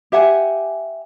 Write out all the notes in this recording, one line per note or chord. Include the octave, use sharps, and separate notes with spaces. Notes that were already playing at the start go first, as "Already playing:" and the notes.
G4 E5 F#5 G#5